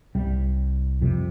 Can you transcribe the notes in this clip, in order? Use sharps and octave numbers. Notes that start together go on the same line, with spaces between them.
C2 C3 G3
F2 C3 G3